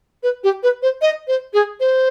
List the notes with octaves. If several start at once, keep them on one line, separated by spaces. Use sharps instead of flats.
B4
G4
B4
C5
D#5
C5
G#4
C5